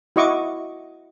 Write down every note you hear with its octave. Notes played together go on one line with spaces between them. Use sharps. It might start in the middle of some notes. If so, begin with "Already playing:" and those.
E4 F#4 D#5 C#6 D6